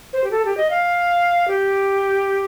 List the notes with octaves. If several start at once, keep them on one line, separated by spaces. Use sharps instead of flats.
C5
G4
A4
G4
D#5
F5
G4